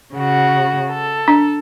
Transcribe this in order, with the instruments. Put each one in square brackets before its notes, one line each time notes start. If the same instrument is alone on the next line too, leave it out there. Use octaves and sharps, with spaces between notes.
[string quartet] C#3 F#4
A4
[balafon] D4